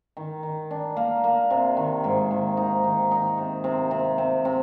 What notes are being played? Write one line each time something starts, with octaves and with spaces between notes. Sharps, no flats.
D#3
D#3
D4
A#3
A#3
C3
D#3
G#2
D#3
D#4
D#3
D#4
C3
C3
C3
C3
C3